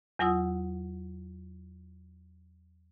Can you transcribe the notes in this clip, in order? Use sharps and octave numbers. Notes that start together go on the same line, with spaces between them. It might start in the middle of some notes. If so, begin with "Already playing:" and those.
E2 F#3 F4 F#5 D#6 E6